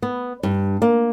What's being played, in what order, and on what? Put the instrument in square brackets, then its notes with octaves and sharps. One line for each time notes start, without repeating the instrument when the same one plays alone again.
[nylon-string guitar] B3
G2
A#3